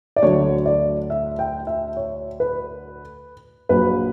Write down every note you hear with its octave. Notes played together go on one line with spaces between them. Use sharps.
D5
D2 D3 F#3 C#5
D5
E5
G5
E5
C#5
B4
A#1 A#2 F#3 B4